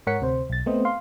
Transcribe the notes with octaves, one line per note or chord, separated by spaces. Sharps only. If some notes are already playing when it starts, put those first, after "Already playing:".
G#2 A#4 C#5 F#5 B6 C#7
D2 C3 C5
B1 A6
A3 B3 C4 C5 D#5
F5 C6